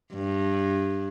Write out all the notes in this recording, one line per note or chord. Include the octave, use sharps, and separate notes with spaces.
G2